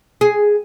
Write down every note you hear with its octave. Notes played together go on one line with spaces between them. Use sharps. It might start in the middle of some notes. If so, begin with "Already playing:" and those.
G#4